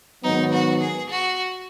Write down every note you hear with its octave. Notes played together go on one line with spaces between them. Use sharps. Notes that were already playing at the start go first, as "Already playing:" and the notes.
G#2 D#3 F#3 B3 D#4
F#4
G#4
F#4